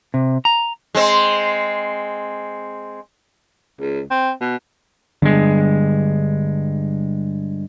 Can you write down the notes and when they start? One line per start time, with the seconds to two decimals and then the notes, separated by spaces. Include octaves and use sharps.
0.14 C3
0.45 A#5
0.95 G#3 C4
3.80 C#2
4.11 C4
4.41 B2
5.22 G2 D3 G3 G#3 B3